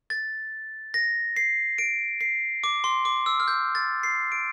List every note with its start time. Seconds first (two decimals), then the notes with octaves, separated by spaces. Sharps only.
0.10 A6
0.94 A#6
1.36 C7
1.78 D7
2.21 C7
2.64 D6
2.84 C6
3.05 D6
3.26 E6
3.40 F6
3.48 G6
3.75 A6
4.03 C7
4.32 D7